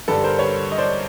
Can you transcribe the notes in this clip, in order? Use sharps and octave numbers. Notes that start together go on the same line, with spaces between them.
G2 D3 G3 A4 B4
A#4 C5
B4 C#5
D#5
C5 D5